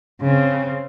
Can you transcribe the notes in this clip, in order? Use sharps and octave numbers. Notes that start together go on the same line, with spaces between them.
C#3 C4